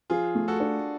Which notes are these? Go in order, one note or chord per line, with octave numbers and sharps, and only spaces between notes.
F3 F4 G#4
A3
F#4 A4
D4